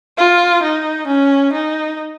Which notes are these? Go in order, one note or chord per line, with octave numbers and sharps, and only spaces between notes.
F4
D#4
C#4
D#4